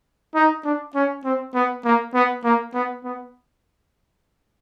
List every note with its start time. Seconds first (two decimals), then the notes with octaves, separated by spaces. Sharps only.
0.35 D#4
0.64 D4
0.95 C#4
1.24 C4
1.54 B3
1.85 A#3
2.14 B3
2.44 A#3
2.74 B3
3.04 B3